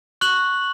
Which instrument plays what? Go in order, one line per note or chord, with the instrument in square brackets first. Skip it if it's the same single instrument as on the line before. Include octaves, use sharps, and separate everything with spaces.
[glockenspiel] C#6 F#6 F#7